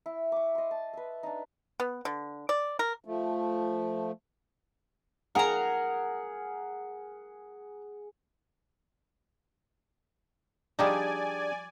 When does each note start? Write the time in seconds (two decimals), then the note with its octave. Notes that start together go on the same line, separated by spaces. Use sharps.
0.06 E4
0.32 C#6 D6
0.55 D#5 C6
0.71 A5
0.93 B4 E5
1.23 D4 D#4
1.80 B3
2.05 D3
2.49 D5
2.79 A#4
3.05 F3 A3
5.35 G#4 A#4 F#5 A#5
10.79 F3 G3 D4 D#4 G4 G#4 D5 G#5